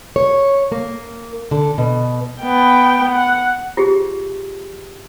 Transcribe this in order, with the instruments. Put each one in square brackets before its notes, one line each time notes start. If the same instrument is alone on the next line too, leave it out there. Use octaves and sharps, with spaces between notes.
[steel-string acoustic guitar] C#5
A#3
D3
B2
[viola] B3 G5
F#5
[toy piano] F4 G4 G#4